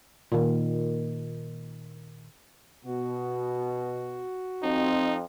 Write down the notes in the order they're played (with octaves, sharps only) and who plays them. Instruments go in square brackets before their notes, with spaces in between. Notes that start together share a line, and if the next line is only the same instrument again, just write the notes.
[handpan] A#2 D#3
[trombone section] B2 [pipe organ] F#4
[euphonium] F2 [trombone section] C4 [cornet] D#4